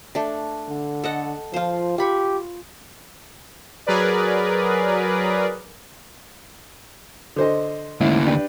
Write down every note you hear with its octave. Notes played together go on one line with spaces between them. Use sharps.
A3 D4
D3
A4 D#5 F#5
F3 F4 C5
F4 G4 B5 C#6
F#3 G#4 A#4 B4 D5
D3 C5 D#5
D2 G#2 A#3 C#4 E4
D4 G4 B4